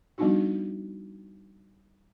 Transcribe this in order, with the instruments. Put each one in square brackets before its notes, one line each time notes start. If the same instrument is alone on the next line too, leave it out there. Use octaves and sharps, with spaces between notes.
[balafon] F3 G3 B3 D4 D#4 F#4